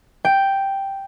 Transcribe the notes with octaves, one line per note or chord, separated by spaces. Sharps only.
G5